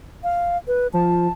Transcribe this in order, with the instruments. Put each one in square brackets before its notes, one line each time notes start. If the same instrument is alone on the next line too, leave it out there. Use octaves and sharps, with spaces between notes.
[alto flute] F5
B4
[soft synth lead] F3 [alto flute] A5